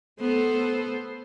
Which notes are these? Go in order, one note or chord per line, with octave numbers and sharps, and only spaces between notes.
B3 A4 C5